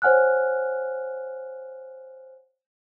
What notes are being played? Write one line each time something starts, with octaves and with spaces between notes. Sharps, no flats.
C5 C#5 F#5 G#5 F6 F#6